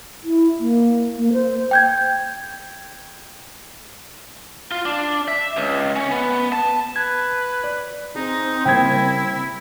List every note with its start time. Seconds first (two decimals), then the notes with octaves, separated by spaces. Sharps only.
0.24 E4
0.60 A#3
1.18 A#3
1.33 C5
1.71 G5 G6 G#6
4.71 F4
4.85 D4
5.28 E5
5.57 C#2
5.96 C#4
6.12 B3
6.52 A5
6.96 B4 G#6
7.64 D5
8.16 C4 D#4 G#4
8.66 C#3 G3 A#3 E4 G5 G#6